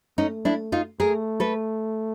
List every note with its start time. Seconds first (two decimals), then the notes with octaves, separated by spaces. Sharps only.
0.18 A3 C#4 D#4
0.45 D4 E4
0.72 D#4 F4
1.00 A3 G#4 A#4
1.40 A4 B4